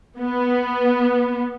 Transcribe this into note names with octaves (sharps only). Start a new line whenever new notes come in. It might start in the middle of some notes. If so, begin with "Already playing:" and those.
B3